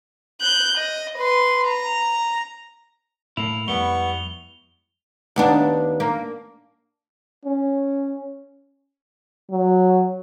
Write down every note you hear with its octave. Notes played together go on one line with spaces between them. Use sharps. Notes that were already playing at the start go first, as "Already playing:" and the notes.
F#6 G6
D#5
B4 C6
A#5
A2 A#3 E4 F7
F2 G3 G#3 B3 E4 C#6 G7
D#2 B3 D4
A#3
C#4
F#3